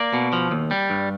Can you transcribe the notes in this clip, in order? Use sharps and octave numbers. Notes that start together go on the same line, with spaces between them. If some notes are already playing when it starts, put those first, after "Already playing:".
Already playing: A#3 D5
B2
F3
D#2
G3
G2